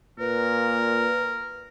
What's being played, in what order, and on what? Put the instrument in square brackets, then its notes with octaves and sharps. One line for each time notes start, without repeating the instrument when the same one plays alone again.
[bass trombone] A#2 [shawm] A#4 [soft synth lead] B4